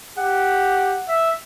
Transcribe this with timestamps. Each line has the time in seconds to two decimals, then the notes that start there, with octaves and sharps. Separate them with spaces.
0.18 G4 F#5
1.08 E5